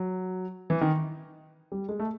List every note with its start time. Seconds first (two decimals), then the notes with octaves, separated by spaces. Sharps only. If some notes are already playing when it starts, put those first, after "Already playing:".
Already playing: F#3
0.70 E3
0.81 D#3
1.72 G3
1.89 G#3
2.00 A3